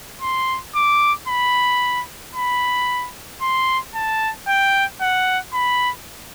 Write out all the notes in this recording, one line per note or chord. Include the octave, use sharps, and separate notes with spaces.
C6
D6
B5
B5
C6
A5
G5
F#5
B5